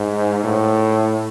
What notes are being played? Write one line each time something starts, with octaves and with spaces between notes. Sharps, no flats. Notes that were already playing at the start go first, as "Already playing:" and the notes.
Already playing: G#2
A2